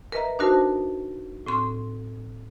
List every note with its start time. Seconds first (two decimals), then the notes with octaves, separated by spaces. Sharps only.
0.12 A#4 B4 D#5 E5 A#5
0.39 D4 D#4 F#4 A#4 C5 A5
1.46 A2 C4 C6